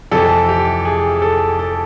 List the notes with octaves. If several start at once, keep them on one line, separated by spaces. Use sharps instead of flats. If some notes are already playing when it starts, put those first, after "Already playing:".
F2 C3 E3 A4
G4
G#4
A4
A4